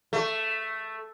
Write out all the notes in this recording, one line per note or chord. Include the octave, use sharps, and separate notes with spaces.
A3